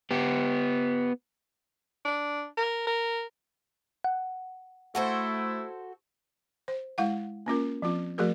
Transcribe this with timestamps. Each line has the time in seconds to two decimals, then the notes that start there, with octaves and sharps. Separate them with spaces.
0.11 B3 G4
2.05 D4
2.57 A#4
2.87 A#4
4.04 F#5
4.95 A3 E4 F#4 A4 C5
6.68 C5
6.98 G#3 E4 F5 F#5
7.46 A#3 C#4 F4 A#4
7.82 F3 C4 F4
8.18 F3 A3 F#4 G#4 A#4